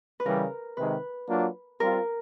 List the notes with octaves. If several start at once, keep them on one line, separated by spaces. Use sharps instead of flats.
B4
C#3 E3 G3 A#4
C3 D#3 G#3 B4
F#3 A#3 D4 F4
G3 C4 F4 A#4